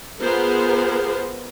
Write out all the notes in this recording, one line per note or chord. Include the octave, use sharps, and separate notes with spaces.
B3 F4 G#4 A#4 C5